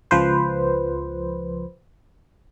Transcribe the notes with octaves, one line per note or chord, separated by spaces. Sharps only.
C#2 F3 B4 C5